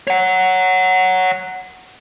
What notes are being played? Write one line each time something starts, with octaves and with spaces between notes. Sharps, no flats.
C#5 F#5